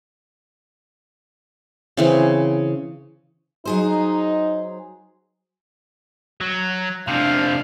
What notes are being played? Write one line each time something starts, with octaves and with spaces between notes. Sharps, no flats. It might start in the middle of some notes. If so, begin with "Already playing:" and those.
C#3 E3 C4
F#3 D#4 G#4 C5
F#3
C3 F3 D4 F5